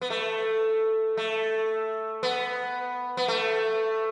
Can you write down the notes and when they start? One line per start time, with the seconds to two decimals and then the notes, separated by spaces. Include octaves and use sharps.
0.01 B3
0.10 A3
1.17 A3
2.23 B3
3.17 B3
3.28 A3